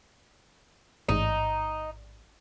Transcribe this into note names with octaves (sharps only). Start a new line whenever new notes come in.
A1 G#2 D#4